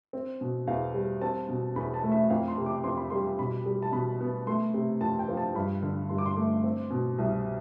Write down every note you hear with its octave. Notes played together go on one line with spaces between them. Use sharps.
C4
B2
E2 F5
G3
C4 A5
B2
E2 B5
A5
A3
E5
F2 F5
C6
C3
D6
F2 C6
B5
G3 C6
B2 B5
G3
A5
B2 B5
B3
A3 C6
C3
F2 A5
G5
F3
A5
G2 B5
D3
G2 C6
D6
C6
A3
C4
B2
C2